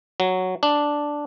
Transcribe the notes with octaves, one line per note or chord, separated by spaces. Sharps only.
F#3
D4